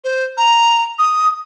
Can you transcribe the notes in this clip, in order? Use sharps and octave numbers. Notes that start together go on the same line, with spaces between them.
C5
A#5
D#6